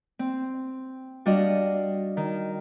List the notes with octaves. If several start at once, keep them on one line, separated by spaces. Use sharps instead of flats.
C4
G3 D4 F#4 D#5 F5
D#3